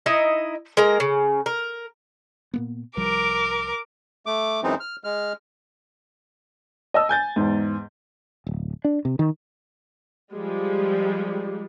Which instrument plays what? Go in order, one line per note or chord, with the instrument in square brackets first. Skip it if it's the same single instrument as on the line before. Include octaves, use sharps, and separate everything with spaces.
[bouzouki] D#4 E4 D#5
G#3 A#3 A#5
C#3
A#4
[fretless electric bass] A#2 A#3 B3
[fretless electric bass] C2 F3 G3 [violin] A#4 D6
[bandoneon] A3 D6
F#2 E3 G#3 C4 D#4
F6
G#3 F6
[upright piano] D#5 A5 E6
G#5 G6 A6
E2 G#2
[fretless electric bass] D1
D4
C3
D#3
[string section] F3 G3 G#3